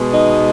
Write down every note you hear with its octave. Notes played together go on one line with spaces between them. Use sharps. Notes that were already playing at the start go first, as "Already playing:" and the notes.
Already playing: B2 G#3 B3
D#4